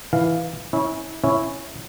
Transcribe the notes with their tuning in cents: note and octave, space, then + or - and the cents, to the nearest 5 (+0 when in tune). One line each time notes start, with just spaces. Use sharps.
E3 +0 F5 +0
C#4 +0 E4 -30
C#4 +0 E4 +0